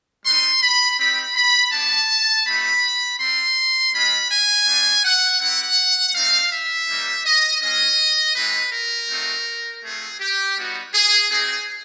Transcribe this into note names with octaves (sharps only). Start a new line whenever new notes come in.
G3 B3 D#4 C6
B5
C4 D#4 G4 B5
B5
B3 D4 G4 A5
A3 C4 D#4 F#4 B5
C4 F4 C6
G#3 C#4 F4 B5
G#5
A3 D4 F4
F#5
C4 E4 G4 F#5
A3 C4 D#4 F5
E5
G3 A#3 D#4
D#5
G#3 C#4 F4 D#5
G#3 C4 D#4 F#4 B4
A#4
A3 C4 D#4 F#4
A3 C4 F4 G#4
G4
G3 B3 D#4 F#4
G#4
C4 D#4 F#4 G#4